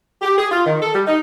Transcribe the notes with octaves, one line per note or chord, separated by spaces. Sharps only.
G4
G#4
F4
D#3
A4
G3
D#4